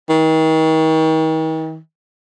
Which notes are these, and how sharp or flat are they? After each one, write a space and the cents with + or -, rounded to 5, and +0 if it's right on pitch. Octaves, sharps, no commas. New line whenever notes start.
D#3 +40